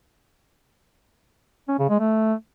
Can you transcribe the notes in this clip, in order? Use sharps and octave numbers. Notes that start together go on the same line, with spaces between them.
C#4
C#3
G#3
A3